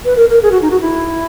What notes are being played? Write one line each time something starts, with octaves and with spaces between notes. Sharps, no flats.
B4
A#4
A#4
G#4
F#4
D#4
F#4
E4